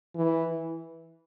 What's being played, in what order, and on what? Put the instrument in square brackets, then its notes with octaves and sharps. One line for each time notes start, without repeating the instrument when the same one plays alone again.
[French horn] E3